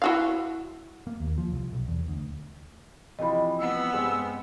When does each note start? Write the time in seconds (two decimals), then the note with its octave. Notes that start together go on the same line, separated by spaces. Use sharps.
0.02 E4 F#4 F5
1.07 A#3
1.20 D#2
1.38 F3
1.52 C2
1.72 B1
1.88 E2
2.08 D2
3.19 C3 E3 F3 D#5 B5
3.60 B3 E6
3.93 G2 G#3 C4